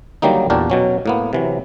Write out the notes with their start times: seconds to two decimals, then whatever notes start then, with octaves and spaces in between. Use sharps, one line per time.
0.22 D3 D#3 F#3 G3 A#3 D#4
0.50 E2 A#2 D4 F#4 G4 A#4
0.70 B2 F#3 C#4
1.06 A2 A#3 B3
1.33 C3 E3 F#3